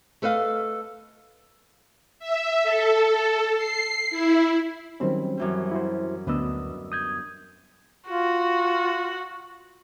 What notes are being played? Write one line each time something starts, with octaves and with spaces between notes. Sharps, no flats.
A3 A4 B4 D#5 F5
E5
A4
C7
E4
D#3 F#3 G3 C4 C#4
F#2 E3 G3
E4 F#4 C5
D2 B3 D4 B4 D#5 E6
D#6 G6 G#6
F4 F#4